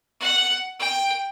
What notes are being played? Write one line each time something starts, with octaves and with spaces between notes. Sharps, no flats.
F#5
G5